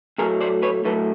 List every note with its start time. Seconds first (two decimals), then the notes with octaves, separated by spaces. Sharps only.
0.18 A2 F#3 A3 G#4 A#4
0.41 C5 D5
0.62 B4 C#5
0.85 A2 F#3 A3 A4 B4